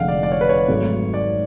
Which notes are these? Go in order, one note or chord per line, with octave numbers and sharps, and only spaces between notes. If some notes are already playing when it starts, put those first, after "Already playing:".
Already playing: F1 F2 D3 G#3 F5 F#5
D5
D5
C#5
B4
C#5
G#1 G#2 F#3 A3
D5